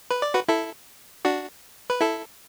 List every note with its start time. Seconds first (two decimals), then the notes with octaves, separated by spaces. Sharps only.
0.11 B4
0.22 D5
0.34 F#4 B4
0.48 E4 A4
1.25 D4 F#4
1.90 B4
2.01 E4 A4